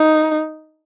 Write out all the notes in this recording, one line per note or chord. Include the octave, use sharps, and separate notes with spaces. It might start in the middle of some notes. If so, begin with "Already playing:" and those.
Already playing: D#4